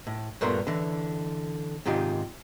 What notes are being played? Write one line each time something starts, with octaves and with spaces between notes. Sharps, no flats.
A2
G2 A#2 A3 B3 A#4 C6
D3 E3
G#2 C3 D#3 F4 G4